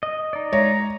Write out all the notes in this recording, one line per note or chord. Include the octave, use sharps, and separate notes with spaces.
D#5
D#4 D5
G#3 C#5 A#5